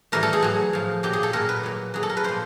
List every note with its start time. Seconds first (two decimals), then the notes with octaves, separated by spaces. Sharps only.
0.12 A2 E3 G3 A#4
0.23 A4
0.33 G#4
0.42 A2 F#3
0.73 A2 F3
1.03 A#2 F#3 G4
1.13 G#4
1.23 A4
1.33 A#2 F#3 A#4
1.49 B4
1.63 A#2 F#3
1.94 A#2 F#3 G#4
2.03 A4
2.10 A#4
2.17 B4
2.24 A#2 F3 C5